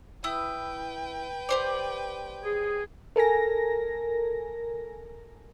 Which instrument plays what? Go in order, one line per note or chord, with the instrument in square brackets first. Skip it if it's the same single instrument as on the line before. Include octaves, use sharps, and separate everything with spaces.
[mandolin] E4 D#6 [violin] B4 G5
[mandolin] G4 C5 D5
[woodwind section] G#4
[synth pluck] A4 A#4 G#5 A#6